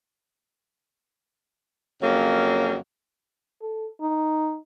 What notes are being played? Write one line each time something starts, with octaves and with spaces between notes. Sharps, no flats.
F2 C#3 F#3 A#3 C#4
A4
D#4